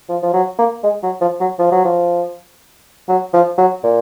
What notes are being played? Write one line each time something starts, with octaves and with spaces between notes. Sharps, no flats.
F3
F3
F#3
A#3
G#3
F#3
F3
F#3
F3
F#3
F3
F#3
F3
F#3
A#2